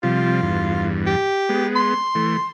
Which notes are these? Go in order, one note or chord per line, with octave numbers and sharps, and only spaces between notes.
C3 F3 G3 F4
E2 G2
G4
G#3 B3
C6
E3 A3